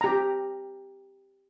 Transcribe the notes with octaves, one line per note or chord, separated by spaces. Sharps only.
G4 A#5